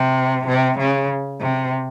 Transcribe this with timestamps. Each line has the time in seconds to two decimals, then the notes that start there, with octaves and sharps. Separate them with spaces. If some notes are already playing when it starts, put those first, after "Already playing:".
Already playing: C3
0.47 C3
0.79 C#3
1.41 C3